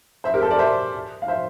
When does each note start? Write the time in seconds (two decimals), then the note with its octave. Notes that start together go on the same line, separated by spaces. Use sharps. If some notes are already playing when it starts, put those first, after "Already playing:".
0.24 C5 E5
0.34 G4 A#4
0.42 A4 C5
0.51 A#4 D5
0.59 C5 E5
1.22 F5
1.28 C5 E5